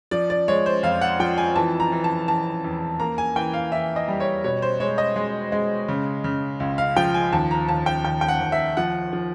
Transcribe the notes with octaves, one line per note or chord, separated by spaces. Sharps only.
F3 D5
D5
G#3 C#5
C5
F2 F5
F#5
F3 G5
G#5
E3 A5
A#5
E3
A5
E3 A5
E2
A#3 A#5
G#5
E3 G5
F5
E3 E5
D#5
G3
C#5
B2 C#5
C5
G#3 C#5
D#5
G#3
G#3
C#3
C#3
C#2
F5
F3 G5
G#5
D#2 A5
A#5
D#2 A5
G5
D#2 G5
G5
F#5
D#2
E5
F3 F#5
F3